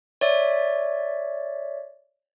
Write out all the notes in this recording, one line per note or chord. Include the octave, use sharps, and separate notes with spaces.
C#5 D5 E5